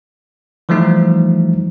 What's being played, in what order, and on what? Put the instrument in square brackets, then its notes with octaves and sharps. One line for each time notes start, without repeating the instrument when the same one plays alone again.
[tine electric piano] E3 F3 G3 A3 D#4